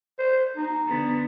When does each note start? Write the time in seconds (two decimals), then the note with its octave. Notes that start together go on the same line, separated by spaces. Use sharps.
0.19 C5
0.57 D#4
0.88 D3 B3